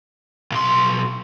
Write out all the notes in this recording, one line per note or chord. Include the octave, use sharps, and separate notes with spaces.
B1 C6